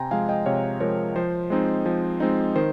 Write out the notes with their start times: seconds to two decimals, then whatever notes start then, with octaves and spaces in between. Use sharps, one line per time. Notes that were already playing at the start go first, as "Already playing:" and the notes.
Already playing: C3 G5 G#5 A#5 C6
0.11 F3 G#3 F5 G#5
0.29 D#5 G5
0.46 C3 C#5 F5
0.80 F3 G#3 A#4 C#5
1.16 F3 C5
1.50 G#3 C4 D#4
1.86 F3
2.20 G#3 C4 D#4
2.56 D#3 C5